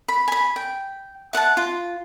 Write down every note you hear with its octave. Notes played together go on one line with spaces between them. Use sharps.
B5
G#5 B5
G5
E5 F#5 G5 A5
F4